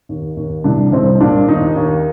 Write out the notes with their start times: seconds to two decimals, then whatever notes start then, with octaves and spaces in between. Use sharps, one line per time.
0.09 D#2
0.37 D#2
0.64 C2 D4
0.92 C2 C4
1.20 A#2 D4
1.48 D#2 D#4
1.76 D#2